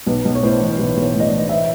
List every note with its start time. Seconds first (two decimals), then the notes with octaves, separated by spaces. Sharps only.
0.06 B1 B4
0.25 B1
0.35 C#5
0.43 A2 C5
0.61 E3
0.78 B1 B4
0.97 B1
1.03 C#5
1.13 A2
1.20 D#5
1.26 D5
1.32 E3
1.49 E5